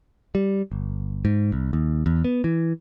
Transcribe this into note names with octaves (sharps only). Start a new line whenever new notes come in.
G3
G1
G#2
C2
D#2
E2
B3
E3